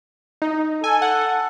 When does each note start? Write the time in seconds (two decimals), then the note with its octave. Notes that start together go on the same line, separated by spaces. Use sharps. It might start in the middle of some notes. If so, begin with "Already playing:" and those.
0.42 D#4
0.84 A4 G#5
1.02 F#5